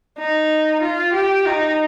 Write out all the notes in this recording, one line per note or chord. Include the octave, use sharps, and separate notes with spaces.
D#4
F4
G4
D#4